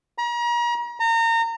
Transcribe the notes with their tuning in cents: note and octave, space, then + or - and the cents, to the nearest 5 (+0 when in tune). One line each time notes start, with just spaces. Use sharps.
A#5 +40
A#5 -30